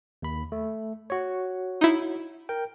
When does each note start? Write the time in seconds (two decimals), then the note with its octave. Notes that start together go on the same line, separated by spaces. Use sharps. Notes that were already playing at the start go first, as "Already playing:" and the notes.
0.22 D#2 B5
0.52 A3
1.10 F#4 C#5
1.81 D#4 E4
2.49 A#4 G5